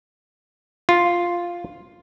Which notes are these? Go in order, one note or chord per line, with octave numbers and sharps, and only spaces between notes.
F4